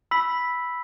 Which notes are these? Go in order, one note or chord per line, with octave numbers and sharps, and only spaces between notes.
B5 E6 B6 F#7